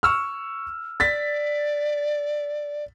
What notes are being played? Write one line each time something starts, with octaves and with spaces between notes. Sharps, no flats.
C#6 E6 F6
D5 A6 B6